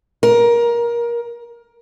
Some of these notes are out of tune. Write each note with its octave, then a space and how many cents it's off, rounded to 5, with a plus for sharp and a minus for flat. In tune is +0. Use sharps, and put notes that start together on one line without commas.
A#4 +20